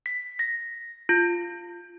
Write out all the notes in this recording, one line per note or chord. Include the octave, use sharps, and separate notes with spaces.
B6
A#6
F4